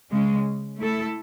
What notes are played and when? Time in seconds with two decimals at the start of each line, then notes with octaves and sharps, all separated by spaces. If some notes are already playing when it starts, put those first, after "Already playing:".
0.10 C#3 G#3 C#4
0.78 A3 E4 A4